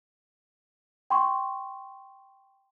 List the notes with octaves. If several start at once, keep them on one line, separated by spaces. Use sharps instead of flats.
G5 C6 C#6